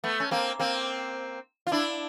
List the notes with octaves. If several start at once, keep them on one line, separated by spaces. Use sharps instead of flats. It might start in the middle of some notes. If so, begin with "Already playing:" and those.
A3 B3
C#4
A#3 C4
A#3 C4
F4
D4 E4